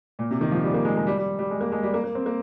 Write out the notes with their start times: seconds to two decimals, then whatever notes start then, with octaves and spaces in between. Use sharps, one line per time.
0.19 A#2
0.31 C3
0.41 D#3
0.51 F3
0.63 G3
0.74 A#3
0.85 G#3
0.96 G#3
1.07 G3
1.18 G3
1.39 G3
1.50 G#3
1.61 A#3
1.72 G#3
1.83 G3
1.94 A#3
2.04 A#3
2.15 C4
2.26 A#3